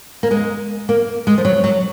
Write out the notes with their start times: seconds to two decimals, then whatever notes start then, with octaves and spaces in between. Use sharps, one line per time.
0.23 A#3
0.31 G#3
0.89 A#3
1.27 G#3
1.38 F3
1.45 F#3
1.64 F#3